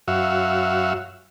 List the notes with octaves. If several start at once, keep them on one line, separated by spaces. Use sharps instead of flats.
F#2 F#4 E5 F5